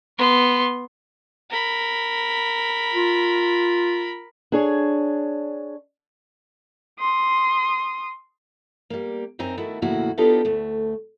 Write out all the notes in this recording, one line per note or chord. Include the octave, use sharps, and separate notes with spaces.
B3 C6
A#4 B5
F4
D4 G#4 C#5
C6 D#6
G3 A#3
F#2 C4 D#4 G#5 A#5
D#3 A3 E4 F#4
E2 A2 C#3 A#3 E4 F#4
B3 D4 D#4 F4 G4 A4
D2 A3